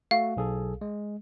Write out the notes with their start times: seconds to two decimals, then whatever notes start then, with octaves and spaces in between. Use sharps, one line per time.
0.11 A3 F#4 F5
0.37 B1 G#4 A4
0.81 G#3